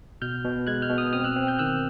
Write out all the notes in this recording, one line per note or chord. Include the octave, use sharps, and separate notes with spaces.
B2 F6 G6
B2
G#3 F#6 G#6
F6 G6
B2
D#6 F6
C4 D#6 F6
E6 F#6
C4
F6 G6
D#3 E6 F#6